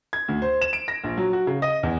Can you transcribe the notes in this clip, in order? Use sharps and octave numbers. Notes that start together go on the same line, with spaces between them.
G#6
D2
C5
E7
D7
A#6
A#1
F#3
F#4
C#3
D#5
E2